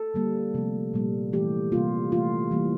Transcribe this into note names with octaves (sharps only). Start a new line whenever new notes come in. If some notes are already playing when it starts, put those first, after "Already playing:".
Already playing: A4
D3 G3 A#3
C3 F3 A3
A#2 G3 A#3
E3 A3 G4
C3 G3 A#3 F4
E3 A3 F4
E3 G3 A#3